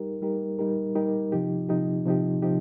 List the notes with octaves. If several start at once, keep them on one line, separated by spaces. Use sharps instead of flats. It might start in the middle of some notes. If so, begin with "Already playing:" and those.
Already playing: G3 D#4 G4 A#4
G3 D#4 G4 A#4
G3 D#4 G4 A#4
G3 D#4 G4 A#4
C3 F3 D#4 G4
C3 F3 D#4 G4
C3 F3 D#4 G4
C3 F3 D#4 G4